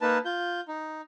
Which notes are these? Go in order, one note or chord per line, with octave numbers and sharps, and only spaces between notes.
A#3 D#4 B4 A5
F4 G6
D#4